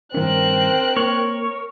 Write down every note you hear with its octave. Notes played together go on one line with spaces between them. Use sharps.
G2 D#3 C4 C#4 A#4 F#6
A#3 C#5